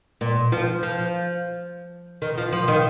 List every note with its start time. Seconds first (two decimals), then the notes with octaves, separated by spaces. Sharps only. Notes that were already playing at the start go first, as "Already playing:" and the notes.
0.21 A#2
0.52 F3
0.83 F3
2.22 D#3
2.38 F3
2.53 F3
2.68 D#3